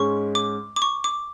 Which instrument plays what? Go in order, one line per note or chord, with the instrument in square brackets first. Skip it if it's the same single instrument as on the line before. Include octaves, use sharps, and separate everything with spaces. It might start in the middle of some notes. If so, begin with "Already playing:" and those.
Already playing: [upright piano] G#2 G#3 C#4 [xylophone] C#6
[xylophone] D6
D6
C#6
D6